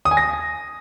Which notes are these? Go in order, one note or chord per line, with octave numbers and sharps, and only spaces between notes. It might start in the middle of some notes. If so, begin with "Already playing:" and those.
D#6
G#5
A#6